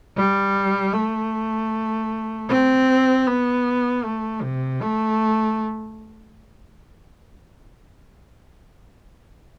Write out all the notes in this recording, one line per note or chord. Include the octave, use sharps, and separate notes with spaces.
G3
A3
C4
B3
A3
C3
A3